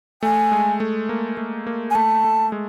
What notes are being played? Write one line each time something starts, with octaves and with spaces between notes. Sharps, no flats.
A3 G#5
G#3
A3
A#3
A3
A#3
G#5
A3 A5
A3
G#3